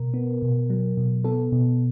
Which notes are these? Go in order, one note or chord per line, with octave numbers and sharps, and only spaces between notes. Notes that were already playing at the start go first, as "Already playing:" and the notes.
Already playing: B2 A#4
B3
B2
F#3
B2
B3 A4
B2